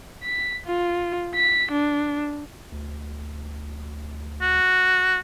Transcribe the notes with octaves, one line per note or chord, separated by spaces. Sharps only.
B6
F4
B6
D4
D2
F#4